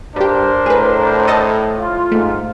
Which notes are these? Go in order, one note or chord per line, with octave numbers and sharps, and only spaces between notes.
G2 G3 D4 G4 A#4 C5
A2 G#4 B4
A4 D#5 A5
F4
G#2 A3